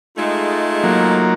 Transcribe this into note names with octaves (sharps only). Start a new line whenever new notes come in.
G#3 A3 D#4 F4
F#3 A#3